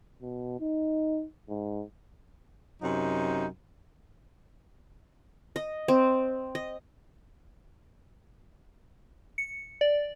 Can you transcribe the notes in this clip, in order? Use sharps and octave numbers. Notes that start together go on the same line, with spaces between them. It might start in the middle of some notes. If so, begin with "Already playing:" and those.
B2
D#4
G#2
F#2 C3 F#3 D#4
D#5
C4
D#5
C#7
D5